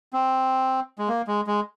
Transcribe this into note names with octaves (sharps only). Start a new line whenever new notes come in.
C4
G#3
A#3
G#3
G#3